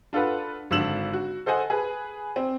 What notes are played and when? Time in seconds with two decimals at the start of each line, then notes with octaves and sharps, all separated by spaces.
0.13 D4 F4 A4 B4 F#5
0.71 G#1 D3 D4 E6 E7 F#7
1.13 F#4
1.46 A4 C5 D#5 F#5 G#5
1.70 G#4 B4
2.36 C4